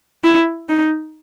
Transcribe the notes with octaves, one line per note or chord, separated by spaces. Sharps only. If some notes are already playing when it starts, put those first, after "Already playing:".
E4
D#4